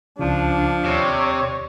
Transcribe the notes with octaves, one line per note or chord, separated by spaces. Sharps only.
C#2 C#3 F3 D4
D#2 C3 C#5 D5